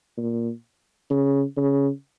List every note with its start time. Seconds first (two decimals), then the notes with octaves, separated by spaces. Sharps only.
0.17 A#2
1.10 C#3
1.56 C#3